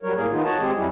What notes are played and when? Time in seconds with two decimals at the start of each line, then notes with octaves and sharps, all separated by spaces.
0.03 F#3 G3 A#4 C#5
0.16 A2 A#3 G#4 A#4
0.31 D#3 B3 D#4 F4
0.45 F#4 C#5 D#5 A5
0.60 G#3 C4 G4 G#4
0.77 F2 F#3 G3 C#4 E4